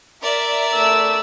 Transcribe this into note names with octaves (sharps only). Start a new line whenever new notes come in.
A#4 D5 E5
A3 E6